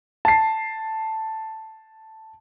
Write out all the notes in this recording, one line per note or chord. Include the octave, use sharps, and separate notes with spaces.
A5 C7